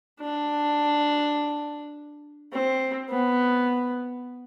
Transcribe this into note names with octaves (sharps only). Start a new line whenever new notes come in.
D4
C4
B3